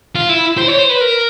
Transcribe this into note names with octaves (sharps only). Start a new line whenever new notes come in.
F4
E4
C5
C#5
C5
B4
A#4